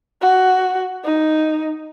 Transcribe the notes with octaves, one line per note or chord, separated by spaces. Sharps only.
F#4
D#4